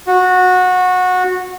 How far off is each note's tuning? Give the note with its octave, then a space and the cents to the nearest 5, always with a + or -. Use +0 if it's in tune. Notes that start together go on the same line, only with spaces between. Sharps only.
F#4 -20